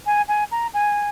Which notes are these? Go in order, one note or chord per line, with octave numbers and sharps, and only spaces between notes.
G#5
G#5
A#5
G#5